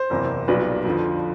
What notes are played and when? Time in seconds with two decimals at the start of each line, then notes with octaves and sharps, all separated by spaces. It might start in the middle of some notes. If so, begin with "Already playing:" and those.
Already playing: C5
0.10 F#1 E2 C3
0.48 B1 A#2 G3 B4
0.85 F2 D3 F3